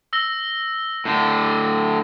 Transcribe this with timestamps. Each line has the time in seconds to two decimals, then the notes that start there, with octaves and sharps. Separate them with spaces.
0.13 E6 A#6 G7
1.05 A2 D3